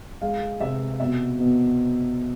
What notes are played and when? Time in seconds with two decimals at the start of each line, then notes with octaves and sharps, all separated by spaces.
0.22 G#3 F5
0.61 C3 E5
1.00 B2 E5
1.39 B2